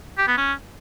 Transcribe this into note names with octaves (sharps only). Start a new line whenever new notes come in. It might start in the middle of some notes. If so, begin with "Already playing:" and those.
G4
B3
C#4